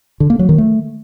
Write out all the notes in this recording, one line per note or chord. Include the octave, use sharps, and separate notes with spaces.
D3
A#3
F#3
D#3
A3